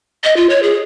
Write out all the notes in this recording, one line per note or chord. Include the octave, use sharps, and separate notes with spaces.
D#5
F4
C#5
G#4